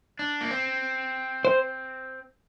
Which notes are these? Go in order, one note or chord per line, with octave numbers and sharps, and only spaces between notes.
D4
A#3
C4
C5